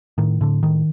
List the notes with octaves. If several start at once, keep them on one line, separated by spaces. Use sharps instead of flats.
A2 D#3
A2 D3
A2 D#3